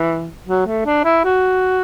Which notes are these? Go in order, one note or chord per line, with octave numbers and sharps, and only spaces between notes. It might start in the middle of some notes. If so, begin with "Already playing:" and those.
Already playing: E3
F#3
A3
D4
E4
F#4